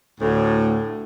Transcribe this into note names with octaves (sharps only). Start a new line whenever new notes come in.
D2 A2